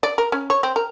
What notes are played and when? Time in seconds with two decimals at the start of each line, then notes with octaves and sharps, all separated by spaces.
0.03 D5
0.18 A#4
0.32 C#4
0.50 C#5
0.63 C4
0.76 A#4